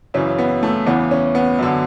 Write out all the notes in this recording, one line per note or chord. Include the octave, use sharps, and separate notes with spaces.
F#2 C#3 E3 C#4
B3
A3
E2 C#3 E3 B3
C#4
B3
F#2 D3